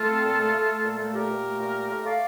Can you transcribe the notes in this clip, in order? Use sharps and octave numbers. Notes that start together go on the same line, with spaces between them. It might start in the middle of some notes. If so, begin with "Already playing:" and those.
Already playing: A3 F4 A4
C4
A#2
A3
A3
A3
A#2
A3
A#2 G4 A#4
A#2
A3
A#2
A3
A3
A3 D5 F5